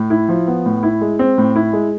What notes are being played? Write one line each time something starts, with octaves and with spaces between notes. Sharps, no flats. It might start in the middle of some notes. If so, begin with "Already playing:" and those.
Already playing: A2
E4
F3
B3
A2
E4
G#3
C4
A2
E4
G#3